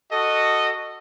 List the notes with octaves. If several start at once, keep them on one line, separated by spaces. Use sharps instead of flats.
F#4 A4 D#5